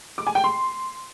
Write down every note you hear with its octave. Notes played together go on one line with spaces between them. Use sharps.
D6
G#5
G5
C6